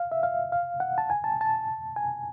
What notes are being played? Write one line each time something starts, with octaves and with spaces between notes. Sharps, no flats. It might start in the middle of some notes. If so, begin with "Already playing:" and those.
Already playing: F5
E5
F5
F5
F#5
A5
G#5
A5
A5
G#5